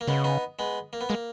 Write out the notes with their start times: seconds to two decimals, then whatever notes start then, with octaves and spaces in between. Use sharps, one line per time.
0.01 A#3
0.07 C#3 G#3 B3
0.24 B3 D#4
0.59 G#3 B3
0.93 A#3
1.01 B3
1.09 G#3 A#3